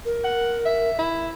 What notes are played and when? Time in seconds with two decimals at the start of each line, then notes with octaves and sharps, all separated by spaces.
0.05 A#4
0.24 F#5
0.66 E5
0.99 E4